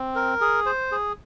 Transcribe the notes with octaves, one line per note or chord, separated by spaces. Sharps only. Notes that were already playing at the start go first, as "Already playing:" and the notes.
Already playing: C4
A#4
G#4
C5
G#4